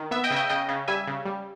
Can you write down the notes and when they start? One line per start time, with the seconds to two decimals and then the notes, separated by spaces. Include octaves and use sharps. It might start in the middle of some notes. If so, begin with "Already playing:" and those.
Already playing: D#3
0.11 B3 E5
0.24 D#5 G5
0.30 C#3 E5
0.36 D#5 G5
0.49 C#3 D#5 G5
0.68 C#3
0.88 G3 E5 G#5
1.07 C#3
1.25 G3